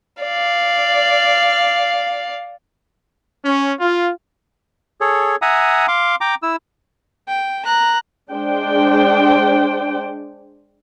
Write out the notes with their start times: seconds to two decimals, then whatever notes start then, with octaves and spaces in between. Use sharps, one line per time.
0.23 D5 F5
3.45 C#4
3.80 F4
5.01 G#4 A4 C#5
5.42 E5 F#5 G#5 A#5 D#6
5.88 F5 C6 D6
6.21 G5 A#5 D6
6.43 E4 E6
7.28 G5
7.65 A#5 F#6
8.31 G#3 D4 C5 G5